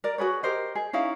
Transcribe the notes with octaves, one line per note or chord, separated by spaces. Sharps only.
A#4 D5
F#4 G#4 B4 C#5
G4 A#4 C5 D#5
G#4
C#4 D#4 E4 F5